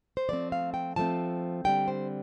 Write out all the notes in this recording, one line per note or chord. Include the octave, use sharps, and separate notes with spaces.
C5
F3 A3 C4 D5
F5
G5
F3 A3 C4 A5
D3 G3 C4 G5
C5